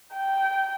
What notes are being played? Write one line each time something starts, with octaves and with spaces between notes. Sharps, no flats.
G5